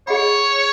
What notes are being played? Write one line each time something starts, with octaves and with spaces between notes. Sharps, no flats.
G#4 C#5 D#5 F#5 B5